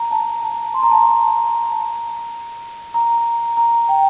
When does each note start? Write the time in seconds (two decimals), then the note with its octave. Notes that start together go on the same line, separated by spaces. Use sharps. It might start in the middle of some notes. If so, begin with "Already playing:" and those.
Already playing: A#5
0.11 A5
0.43 A5
0.74 C6
0.83 A#5
0.91 A5
1.01 A#5
2.94 A#5
3.57 A#5
3.89 G5